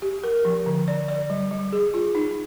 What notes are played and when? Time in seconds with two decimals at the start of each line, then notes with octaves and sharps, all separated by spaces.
0.02 G4
0.24 A#4
0.45 F3
0.66 D3
0.88 D5
1.09 D5
1.30 G3
1.51 G3
1.72 G#4
1.94 F4
2.15 D#4